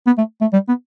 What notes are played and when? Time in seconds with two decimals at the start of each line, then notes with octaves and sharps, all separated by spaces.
0.06 B3
0.18 A3
0.41 A3
0.53 G3
0.68 B3